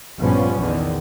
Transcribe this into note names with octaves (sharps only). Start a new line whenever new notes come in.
A#1 G2 F3 G3 B3 C#4
A#1 E2 D3 D#3